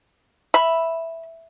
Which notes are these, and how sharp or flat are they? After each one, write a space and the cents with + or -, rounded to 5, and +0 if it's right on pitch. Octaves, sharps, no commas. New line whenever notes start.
E5 +0 B5 -5